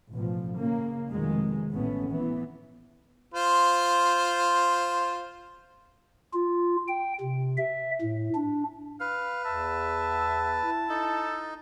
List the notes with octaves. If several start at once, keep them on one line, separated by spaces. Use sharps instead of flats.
A1 B2 F3
C#3 A#3
F1 B2 D#3 G#3
A1 A3 B3 C#4
E3 B3
F4 C5
F4
G5
C3
E5
A2
D4
B4 F5
E2 E5 A5
E4
D#4 A4